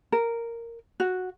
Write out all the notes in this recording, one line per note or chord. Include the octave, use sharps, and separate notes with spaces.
A#4
F#4